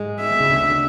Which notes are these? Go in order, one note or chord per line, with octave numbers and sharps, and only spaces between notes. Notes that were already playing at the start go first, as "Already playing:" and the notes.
Already playing: G#2 G#3
E5
C#3
D2 D3